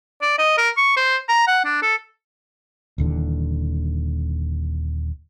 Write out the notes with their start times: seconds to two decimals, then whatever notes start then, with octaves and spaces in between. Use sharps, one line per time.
0.22 D5
0.38 D#5
0.58 A#4
0.77 C#6
0.96 C5
1.29 A#5
1.47 F#5
1.65 D4
1.82 A4
2.98 D#1 D#2 D3 E3